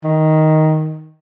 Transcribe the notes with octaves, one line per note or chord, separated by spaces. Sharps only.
D#3